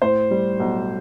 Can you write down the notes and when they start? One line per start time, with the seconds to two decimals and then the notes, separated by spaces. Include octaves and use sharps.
0.02 A2 C5
0.31 G3
0.60 B1